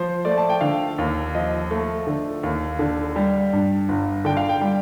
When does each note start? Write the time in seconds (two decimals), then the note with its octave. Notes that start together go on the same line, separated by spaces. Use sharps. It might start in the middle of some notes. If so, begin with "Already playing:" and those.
Already playing: F3 C5
0.25 A3 D5
0.38 A5
0.49 G5
0.61 D3 F5
0.98 D#2
1.34 F3 D#5
1.71 A3
2.07 D3
2.43 D#2
2.79 D3
3.16 G3
3.53 G2
3.89 G1
4.25 D3 G5
4.37 F5
4.49 G5
4.61 G3